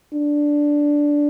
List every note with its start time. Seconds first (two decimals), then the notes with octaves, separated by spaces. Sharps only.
0.13 D4